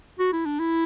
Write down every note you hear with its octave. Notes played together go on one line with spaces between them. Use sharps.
F#4
E4
D4
E4